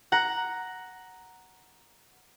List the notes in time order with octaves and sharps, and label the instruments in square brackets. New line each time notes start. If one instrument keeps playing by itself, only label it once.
[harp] F#5 A#5